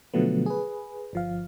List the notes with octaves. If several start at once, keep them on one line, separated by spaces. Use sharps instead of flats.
B2 D3 F3 F#3 A3 B3
G#4 B4
G1 F3 F5